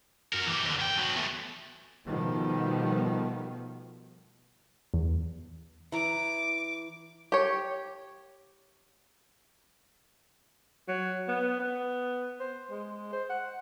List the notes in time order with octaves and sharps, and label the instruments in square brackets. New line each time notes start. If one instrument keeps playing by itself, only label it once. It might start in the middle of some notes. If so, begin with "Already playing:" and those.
[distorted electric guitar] F#4 A#4
E3 G4
D#2 D3
G#2 G5
B2 F#3
E2 A2
[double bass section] B2 D#3 F3 G3 A3 B3
[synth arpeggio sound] E2
[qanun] E3 A#5 [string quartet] D6
[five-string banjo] G4 C#5
[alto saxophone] F#3
B3
B3
C5
G#3
C5
F#5